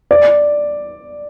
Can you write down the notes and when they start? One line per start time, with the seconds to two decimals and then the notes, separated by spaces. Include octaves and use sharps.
0.11 D5